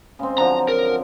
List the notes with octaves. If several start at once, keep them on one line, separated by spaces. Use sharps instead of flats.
C#3 G#3 C4
D3 F3 F#3 A#5
A#4